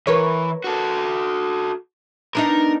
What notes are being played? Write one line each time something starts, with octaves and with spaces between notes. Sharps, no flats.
E3 A#4 B4 C#5
F#4 A4
B3 D4 D#4 A#4